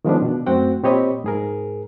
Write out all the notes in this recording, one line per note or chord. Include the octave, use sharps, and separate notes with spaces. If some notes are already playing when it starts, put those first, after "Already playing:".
D#3 F3 G#3 B3 C#4 D4
B2 D4
F#2 A3 C4 F#4 F#5 G5
A#2 C4 G4 C#5 D#5 B5
G#2 G#4 A#4